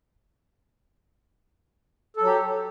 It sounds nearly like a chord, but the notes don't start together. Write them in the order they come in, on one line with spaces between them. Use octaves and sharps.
A4 F#3 G4